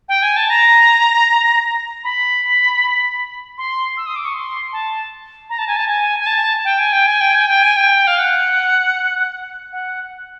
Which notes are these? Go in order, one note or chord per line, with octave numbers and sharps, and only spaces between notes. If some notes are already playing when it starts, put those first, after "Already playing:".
G5
G#5
A5
A#5
B5
C6
E6
D#6
D6
C#6
C6
A5
A#5
A5
G#5
A5
G#5
G#5
A5
G5
G#5
G5
G#5
G5
G#5
G5
G#5
G5
F5
F#5
F#5